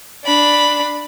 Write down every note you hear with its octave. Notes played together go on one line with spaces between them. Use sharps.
D4 B5